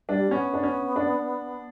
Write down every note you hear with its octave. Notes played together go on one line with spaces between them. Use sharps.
G3 D4
B3 C#4
D4
C#4
D4